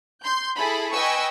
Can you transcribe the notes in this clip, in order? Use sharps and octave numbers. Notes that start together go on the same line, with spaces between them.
C6 G6
E4 G#4 A4 B5
B4 D#5 G5 G#5 C#6 E6